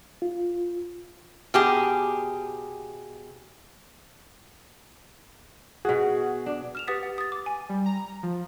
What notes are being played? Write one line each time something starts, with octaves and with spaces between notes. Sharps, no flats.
F4
B2 G4 G#4
B2 F#4 G#4
D4
F6 E7 F7
G4 B4 F#5 D#6 A6 B6
F#5
D#6 A6
D6
G#5
G3
A#5
F3